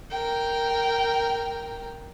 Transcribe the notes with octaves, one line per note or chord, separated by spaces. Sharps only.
A#4 G5